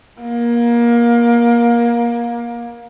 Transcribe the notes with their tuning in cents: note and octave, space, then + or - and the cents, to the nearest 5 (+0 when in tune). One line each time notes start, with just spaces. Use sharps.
A#3 +25